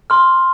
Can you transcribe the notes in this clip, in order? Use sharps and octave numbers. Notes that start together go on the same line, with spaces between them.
C6 F6